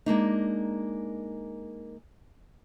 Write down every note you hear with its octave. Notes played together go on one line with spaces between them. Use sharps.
G#3 A#3 D4 D#4